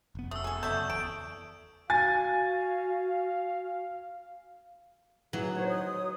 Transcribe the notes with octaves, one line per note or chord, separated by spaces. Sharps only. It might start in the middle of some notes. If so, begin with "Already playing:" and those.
F1 B3
F#3 A3 C#4 D#6 E6
A2 A3 G#4 A4
F#1 A3 C#5 D5 E5 A5 G6
E2 A5 D7
F#4 F5 G#5 A6
E3 F#3 E4 G#4
D#4 C5 C#5
D#6